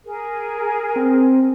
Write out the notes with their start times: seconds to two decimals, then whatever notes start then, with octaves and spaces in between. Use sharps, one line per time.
0.05 G#4 A#4
0.96 C4